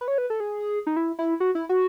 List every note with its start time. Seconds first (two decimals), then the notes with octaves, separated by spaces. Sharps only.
0.01 B4
0.08 C#5
0.18 B4
0.30 A4
0.40 G#4
0.87 D#4
0.96 E4
1.19 E4
1.40 F#4
1.55 E4
1.69 F#4